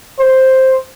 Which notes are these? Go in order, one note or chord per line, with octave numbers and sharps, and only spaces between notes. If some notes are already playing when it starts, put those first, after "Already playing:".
C5